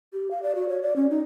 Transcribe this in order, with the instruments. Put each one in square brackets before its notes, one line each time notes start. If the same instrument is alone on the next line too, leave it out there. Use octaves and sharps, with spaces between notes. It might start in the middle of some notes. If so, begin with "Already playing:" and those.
[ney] G4
F5
D5
F#4
C#5
D5
C#4
D#4